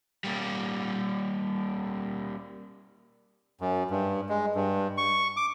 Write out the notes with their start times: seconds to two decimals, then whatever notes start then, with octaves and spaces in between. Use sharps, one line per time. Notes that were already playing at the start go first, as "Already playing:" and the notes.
0.24 G3 A#3
3.61 F#2
3.91 G2
4.29 G#3
4.55 G2
4.97 C#6
5.37 D6